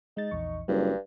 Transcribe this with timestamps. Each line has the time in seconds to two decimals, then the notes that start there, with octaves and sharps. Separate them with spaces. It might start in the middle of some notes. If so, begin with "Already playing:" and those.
0.17 G#3 D#4 A6
0.31 A#1 E2 C#6
0.68 F#1 G2 G3